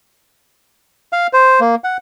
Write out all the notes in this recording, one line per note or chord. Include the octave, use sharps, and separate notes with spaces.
F5
C5
A#3
F#5